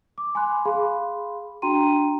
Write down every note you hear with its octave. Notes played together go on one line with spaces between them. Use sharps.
D6
G#5 B5 C6 D6 F#6
G#4 F5 B5 C6
D4 F#4 G5 A#5 C6 D#7